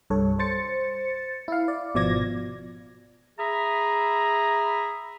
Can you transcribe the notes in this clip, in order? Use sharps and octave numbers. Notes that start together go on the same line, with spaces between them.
C2 G2 A4 C#5
C5 A6 C#7
E4 F5
D5
G#1 B2 F3 D5 G#6 A#6
G#4 E5 A#5 B5